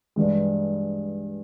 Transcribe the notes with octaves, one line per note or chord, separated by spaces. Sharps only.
G2 E3 G#3